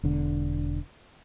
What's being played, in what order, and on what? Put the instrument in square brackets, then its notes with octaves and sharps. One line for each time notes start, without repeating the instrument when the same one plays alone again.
[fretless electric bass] E1 D3